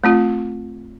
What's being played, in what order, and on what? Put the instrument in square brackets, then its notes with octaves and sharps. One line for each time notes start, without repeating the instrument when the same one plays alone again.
[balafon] A3 C4 F4